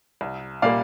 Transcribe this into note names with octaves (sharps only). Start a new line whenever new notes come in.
C2
A#2 G3 A#3 D5 F5